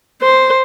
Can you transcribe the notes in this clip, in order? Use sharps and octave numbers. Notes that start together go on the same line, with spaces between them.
C5